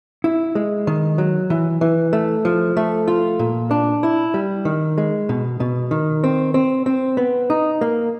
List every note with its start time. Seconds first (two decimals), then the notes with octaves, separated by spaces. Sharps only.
0.24 E4
0.55 G#3
0.87 D#3
1.18 F#3
1.50 E3
1.81 E3
2.13 A3
2.45 F3
2.77 A3
3.08 F4
3.39 A#2
3.71 D4
4.03 E4
4.34 G3
4.65 D#3
4.98 G#3
5.29 B2
5.60 B2
5.91 D#3
6.24 C4
6.54 C4
6.86 C4
7.17 B3
7.50 D#4
7.81 A#3